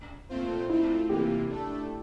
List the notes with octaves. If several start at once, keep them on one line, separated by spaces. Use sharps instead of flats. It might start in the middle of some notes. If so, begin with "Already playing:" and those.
A#2 A3 C4 F4 C5
A3 C4 E4 F4
C3 E3 A#3 F4 G4
A3 D4 A4